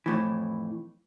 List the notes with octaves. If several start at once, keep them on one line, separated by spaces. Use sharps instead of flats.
F2 A2 E3